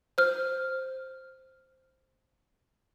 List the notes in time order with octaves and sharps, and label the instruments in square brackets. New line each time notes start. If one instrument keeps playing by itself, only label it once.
[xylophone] C5 F6